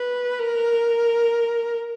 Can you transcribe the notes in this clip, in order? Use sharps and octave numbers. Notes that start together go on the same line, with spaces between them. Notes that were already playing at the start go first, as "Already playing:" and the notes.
Already playing: B4
A#4